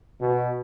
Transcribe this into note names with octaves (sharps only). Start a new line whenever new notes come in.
B2